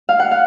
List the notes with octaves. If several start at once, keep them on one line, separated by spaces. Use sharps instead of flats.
F5
F#5
F5